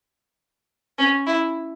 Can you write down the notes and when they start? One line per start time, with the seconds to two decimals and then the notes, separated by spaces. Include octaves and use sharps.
0.98 C#4
1.27 E4